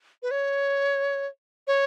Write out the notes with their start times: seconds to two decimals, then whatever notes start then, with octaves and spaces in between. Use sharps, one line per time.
0.23 B4
0.31 C#5
1.67 C#5